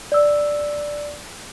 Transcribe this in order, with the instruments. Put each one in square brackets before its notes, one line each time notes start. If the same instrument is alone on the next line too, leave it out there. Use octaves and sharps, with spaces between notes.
[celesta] D5 E6